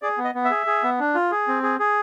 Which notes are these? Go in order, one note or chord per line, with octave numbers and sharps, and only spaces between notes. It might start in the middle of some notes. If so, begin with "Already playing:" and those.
G#4 D5
B3
D#5
B3
E5
G#4
G#4
B3
D4
F4
G#4
C4
G#4
G#4